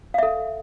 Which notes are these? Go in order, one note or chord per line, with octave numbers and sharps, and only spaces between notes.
A4 E5 F5